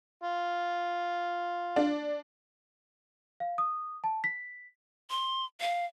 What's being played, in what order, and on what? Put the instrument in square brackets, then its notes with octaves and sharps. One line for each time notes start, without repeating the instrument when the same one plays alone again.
[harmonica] F4
[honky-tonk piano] D4
[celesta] F5
D#6
A5
B6
[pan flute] C6
F5